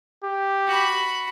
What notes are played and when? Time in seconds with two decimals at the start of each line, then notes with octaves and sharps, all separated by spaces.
0.24 G4
0.67 F#4 B5